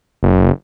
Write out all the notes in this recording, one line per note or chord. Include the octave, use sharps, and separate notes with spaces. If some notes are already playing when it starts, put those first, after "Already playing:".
F#1